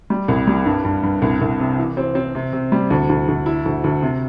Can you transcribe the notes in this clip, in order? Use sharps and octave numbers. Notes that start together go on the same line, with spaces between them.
G3
C2
G3
G2
G2
G2
C2
C2
C3
E3
C4
C4
C3
C3
G3
D2
D2
D2
E4
D2
D2
C3